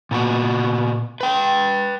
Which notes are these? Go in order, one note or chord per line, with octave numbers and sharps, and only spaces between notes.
A#2 B3 F#4
B4 G5